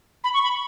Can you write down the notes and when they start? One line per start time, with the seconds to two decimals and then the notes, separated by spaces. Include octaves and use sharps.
0.24 B5
0.34 C#6
0.43 B5